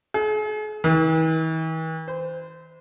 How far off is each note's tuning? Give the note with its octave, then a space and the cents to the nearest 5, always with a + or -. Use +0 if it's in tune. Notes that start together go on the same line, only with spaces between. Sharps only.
G#4 +40
E3 -45
C5 -20